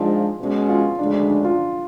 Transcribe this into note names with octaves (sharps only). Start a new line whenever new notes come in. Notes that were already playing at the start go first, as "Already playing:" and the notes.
Already playing: G#2 F3 G#3 D4 F4
B2 G#3 C#4
F4
D2 C#3 G#3 D4
D4
D4
F4